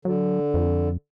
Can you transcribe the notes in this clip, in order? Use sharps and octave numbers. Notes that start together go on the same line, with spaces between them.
D3 F#3
F2